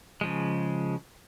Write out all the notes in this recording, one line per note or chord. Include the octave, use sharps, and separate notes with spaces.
C#3 F3 G#3